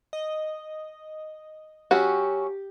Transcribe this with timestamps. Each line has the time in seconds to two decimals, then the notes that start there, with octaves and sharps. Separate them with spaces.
0.13 D#5
1.91 F#3 C#4 F#4 G4